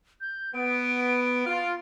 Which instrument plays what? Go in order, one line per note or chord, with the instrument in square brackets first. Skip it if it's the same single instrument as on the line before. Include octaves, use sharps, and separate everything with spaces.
[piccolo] G6
[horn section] B3 [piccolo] D7
[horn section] F4